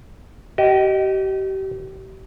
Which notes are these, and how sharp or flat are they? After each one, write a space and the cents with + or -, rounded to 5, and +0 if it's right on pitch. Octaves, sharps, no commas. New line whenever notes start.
G4 -35 D#5 +0